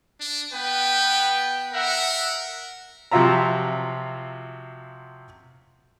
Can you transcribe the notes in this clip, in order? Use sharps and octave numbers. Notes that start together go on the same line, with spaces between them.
D4
B3 B4 G5
A#4 E5 F#5
C3 F3 F#3 F4 E5 A#5